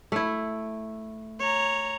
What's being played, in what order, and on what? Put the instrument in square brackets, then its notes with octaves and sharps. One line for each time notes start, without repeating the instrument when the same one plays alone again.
[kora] A3 E4
[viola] C#5 A#5